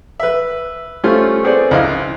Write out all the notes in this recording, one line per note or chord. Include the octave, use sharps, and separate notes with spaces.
B4 E5
G3 A3 C#4 F4 A4 C5
B3 C4 G#4 A4 C5 D5
C#2 G#2 E4 D#5 F5